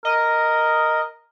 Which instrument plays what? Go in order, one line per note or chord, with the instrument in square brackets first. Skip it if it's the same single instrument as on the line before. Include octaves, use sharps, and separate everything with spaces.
[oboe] A#4 [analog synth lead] D#5